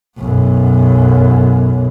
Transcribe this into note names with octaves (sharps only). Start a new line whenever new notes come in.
B1 F#2